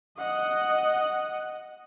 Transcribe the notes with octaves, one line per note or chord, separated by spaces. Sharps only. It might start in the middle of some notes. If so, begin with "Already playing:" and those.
D#5 F#5